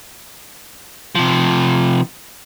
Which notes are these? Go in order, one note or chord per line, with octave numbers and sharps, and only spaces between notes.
C3 F3